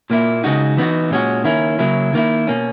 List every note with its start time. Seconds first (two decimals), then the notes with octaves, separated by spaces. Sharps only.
0.10 A#2 A#3 E4
0.44 C#3 G#3 D#4 F#4
0.77 E3 B3 D#4 F#4
1.11 A#2 G#3 C#4 F#4
1.44 D#3 A#3 C#4 E4
1.79 C#3 F#3 A#3 E4
2.13 D#3 A#3 E4
2.47 B2 A#3 C#4